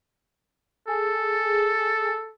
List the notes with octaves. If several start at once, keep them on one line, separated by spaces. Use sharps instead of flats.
G#4 A4